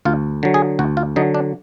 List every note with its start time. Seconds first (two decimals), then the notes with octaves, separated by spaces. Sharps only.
0.05 D2 F4
0.43 D3 F#3
0.54 G#4
0.79 D2 F#4
0.97 F4
1.16 D3 F#3 D#4
1.34 D4